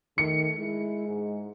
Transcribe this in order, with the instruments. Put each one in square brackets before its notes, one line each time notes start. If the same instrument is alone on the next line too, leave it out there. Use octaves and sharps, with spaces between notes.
[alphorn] D#3 [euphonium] A3 [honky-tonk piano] C#7
[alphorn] G#3 [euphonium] E4
[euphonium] G#2